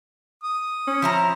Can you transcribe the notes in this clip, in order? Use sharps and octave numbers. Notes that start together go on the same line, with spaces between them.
D#6
C#4
F3 E4 A#5